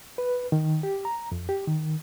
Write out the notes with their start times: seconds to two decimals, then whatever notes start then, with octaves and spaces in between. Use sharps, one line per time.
0.18 B4
0.52 D#3
0.83 G4
1.05 A#5
1.32 F2
1.49 G4
1.67 D#3